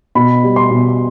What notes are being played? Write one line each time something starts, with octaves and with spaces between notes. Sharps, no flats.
B2 B5
G3
C6
B2